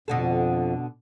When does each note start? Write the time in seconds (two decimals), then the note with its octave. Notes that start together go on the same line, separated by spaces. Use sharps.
0.08 F2 B2 D3 A4